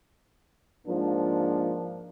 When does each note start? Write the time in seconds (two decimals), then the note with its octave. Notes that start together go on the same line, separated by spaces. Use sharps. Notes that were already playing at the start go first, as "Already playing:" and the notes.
0.87 G#2 F3 A#3 D4